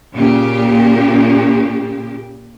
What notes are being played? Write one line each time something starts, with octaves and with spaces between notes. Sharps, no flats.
A#2 C#3 G4